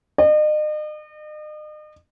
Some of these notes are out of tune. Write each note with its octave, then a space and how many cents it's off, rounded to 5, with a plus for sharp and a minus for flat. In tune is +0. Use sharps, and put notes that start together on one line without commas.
D#5 -40